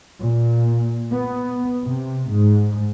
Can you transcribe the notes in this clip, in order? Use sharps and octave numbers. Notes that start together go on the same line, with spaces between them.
A#2
B3
C3
G#2